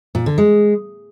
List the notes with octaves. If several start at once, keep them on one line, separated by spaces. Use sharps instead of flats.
A#2
D3
G#3